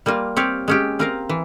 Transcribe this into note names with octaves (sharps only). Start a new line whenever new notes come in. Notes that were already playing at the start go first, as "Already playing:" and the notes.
G3 A#3 F4
C4 G4 C#5 F5
G#3 C#4 G4
C4 F4 A#4 F5
E3